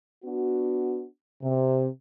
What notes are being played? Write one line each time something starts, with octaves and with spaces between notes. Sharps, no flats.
B3 D4 F#4
C3